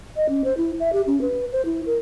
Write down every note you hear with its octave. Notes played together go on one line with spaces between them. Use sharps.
D#5
C#4
C5
E4
E5
G4
C#4
B4
C5
E4
A#4